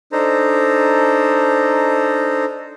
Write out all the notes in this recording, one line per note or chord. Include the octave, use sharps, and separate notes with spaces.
D4 D#4 A4 C5 A#5